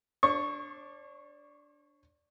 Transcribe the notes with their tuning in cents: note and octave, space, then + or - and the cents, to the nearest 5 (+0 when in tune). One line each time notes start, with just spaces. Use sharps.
D4 -5 C#5 -45 C#6 +0